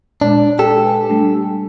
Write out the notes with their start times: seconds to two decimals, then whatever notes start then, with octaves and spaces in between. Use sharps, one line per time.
0.21 A#2 G#3 D4 C#5
0.59 G4 A4
0.84 B4 G#5
1.09 G3 A3 D4